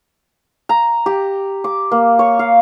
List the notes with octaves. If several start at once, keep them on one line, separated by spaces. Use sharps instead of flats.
A#5
G4
D6
A#3
C#5
F5